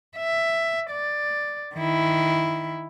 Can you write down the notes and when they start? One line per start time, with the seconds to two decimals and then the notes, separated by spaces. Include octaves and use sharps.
0.17 E5
0.91 D5
1.75 D#3 E4